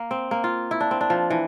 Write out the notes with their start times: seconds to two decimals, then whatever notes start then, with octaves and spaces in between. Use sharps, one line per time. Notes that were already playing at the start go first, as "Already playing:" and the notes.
Already playing: A#3
0.11 C4
0.31 A#3
0.44 F4
0.71 E4
0.80 D4
0.91 C4
1.01 D4
1.10 F3
1.30 E3